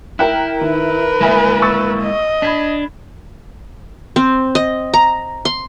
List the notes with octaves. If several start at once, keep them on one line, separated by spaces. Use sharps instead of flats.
E4 A#4 G5 F#6
D#3 A#4 B4
G#3 A#3 E4 E5 G#5 B5
C#6 E6 A6
D#5
D4 B5 G#6 B6
C4
D#5
A#5
C6